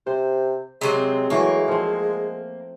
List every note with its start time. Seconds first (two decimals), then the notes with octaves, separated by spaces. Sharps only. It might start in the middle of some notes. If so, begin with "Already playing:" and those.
0.07 C3 C5
0.81 C3 F#3 G#3 C4
1.30 E3 F#3 A3 A#3
1.68 F3 C4